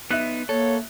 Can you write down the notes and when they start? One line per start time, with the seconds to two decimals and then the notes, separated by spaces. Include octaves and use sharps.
0.10 B3 D#4 E5 F#6
0.49 A#3 A4 C#5